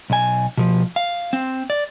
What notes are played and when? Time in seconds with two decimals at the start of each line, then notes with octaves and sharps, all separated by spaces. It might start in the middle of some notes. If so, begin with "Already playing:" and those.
0.10 B1 G#5
0.57 B2 F3
0.96 F5
1.33 C4
1.70 D5